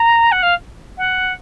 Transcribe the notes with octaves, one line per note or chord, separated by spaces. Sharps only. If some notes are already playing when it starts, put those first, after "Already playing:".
Already playing: A#5
F#5
F5
F#5